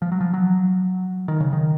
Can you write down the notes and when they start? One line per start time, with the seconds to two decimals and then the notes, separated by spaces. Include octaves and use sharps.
0.02 F3
0.12 F#3
0.21 F3
0.34 F#3
1.28 D#3
1.40 C#3
1.53 D#3